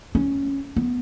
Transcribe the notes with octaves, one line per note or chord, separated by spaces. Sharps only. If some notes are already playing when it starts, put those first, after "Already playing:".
C#4
B3